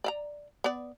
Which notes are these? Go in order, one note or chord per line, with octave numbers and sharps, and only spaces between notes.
D5 E5 A#5
B3 D5